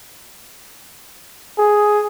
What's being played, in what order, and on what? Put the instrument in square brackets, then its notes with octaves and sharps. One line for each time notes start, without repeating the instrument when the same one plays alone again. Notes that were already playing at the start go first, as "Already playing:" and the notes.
[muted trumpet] G#4